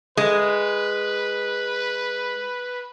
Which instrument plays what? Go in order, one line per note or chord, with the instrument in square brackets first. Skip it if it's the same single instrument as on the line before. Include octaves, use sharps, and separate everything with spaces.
[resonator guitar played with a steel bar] G#3 [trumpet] B4